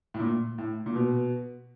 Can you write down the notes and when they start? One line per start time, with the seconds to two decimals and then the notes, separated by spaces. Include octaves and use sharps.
0.14 A2
0.19 A#2
0.58 A2
0.86 A#2
0.95 B2